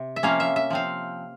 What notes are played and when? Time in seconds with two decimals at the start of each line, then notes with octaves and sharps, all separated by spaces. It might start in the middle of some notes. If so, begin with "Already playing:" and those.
Already playing: C3
0.16 E5
0.23 C3 F3 A#3 C#4 F5
0.40 E5
0.56 E5
0.70 F3 C4 F5